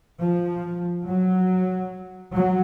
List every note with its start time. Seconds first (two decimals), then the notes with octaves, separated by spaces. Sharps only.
0.20 F3
1.06 F#3
2.33 F#3